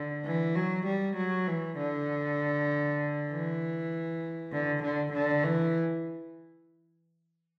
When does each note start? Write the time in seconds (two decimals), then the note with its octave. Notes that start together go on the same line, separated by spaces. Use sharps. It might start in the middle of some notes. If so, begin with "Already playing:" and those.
Already playing: D3
0.25 E3
0.56 F#3
0.86 G3
1.17 F#3
1.47 E3
1.77 D3
3.30 E3
4.52 D3
4.83 D3
5.13 D3
5.44 E3